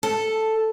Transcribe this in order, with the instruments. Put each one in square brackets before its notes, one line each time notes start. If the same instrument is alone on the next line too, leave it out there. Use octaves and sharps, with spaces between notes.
[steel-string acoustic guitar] A4